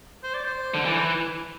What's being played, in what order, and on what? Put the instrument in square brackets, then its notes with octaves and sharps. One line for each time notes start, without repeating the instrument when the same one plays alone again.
[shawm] C5
D5
C5
[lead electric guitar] D3
[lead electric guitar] E3 [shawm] D5
[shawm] C5
B4